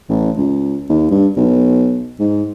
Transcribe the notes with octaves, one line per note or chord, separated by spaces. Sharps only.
A1
C#2
D#2
G2
B1
G#2